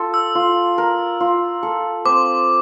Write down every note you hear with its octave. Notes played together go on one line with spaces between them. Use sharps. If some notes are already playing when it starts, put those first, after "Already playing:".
Already playing: F4 A4
E6
F4
A#4
F4
A4
C4 D6